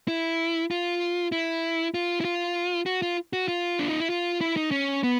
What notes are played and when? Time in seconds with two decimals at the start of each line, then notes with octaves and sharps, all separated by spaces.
0.08 E4
0.71 F4
1.32 E4
1.94 F4
2.21 E4
2.25 F4
2.86 F#4
3.02 F4
3.33 F#4
3.48 F4
3.79 D4
3.89 D#4
4.00 E4
4.10 F4
4.41 E4
4.57 D#4
4.71 C#4
5.03 B3